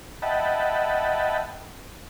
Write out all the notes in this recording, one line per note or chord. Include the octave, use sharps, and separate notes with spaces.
D#5 E5 F#5 G5 A5 B5